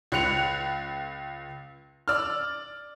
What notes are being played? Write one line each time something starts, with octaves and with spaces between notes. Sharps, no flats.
C#2 F#6 C#7 F7
D5 E6 F6